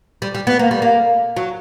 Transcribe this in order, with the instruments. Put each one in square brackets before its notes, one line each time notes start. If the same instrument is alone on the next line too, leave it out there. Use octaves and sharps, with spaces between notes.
[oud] G3
G3
B3
A#3
G3
A#3
F#3